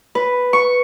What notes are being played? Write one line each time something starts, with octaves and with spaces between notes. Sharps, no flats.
B4
C#6